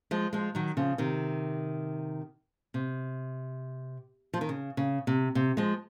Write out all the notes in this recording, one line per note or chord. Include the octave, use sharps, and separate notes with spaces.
F3 G#3
F3 G#3
D#3 F#3
C#3 F3
C3 D#3
C3
F3
D#3
C#3
C#3
C3
C3
F3 G#3